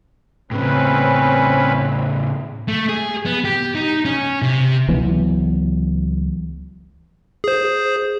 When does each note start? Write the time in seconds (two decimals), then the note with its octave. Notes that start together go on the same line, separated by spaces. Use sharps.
0.51 A2 C#3 C4 C#4 B4
2.68 A3
2.89 G#4
3.26 B3
3.44 G4
3.75 D#4
4.05 C#4
4.42 C3
4.88 C#2 E3 F#3 B3
7.44 G#4 C5